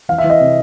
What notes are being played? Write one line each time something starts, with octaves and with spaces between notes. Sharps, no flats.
E3 F5
E5
E3
D#5
C3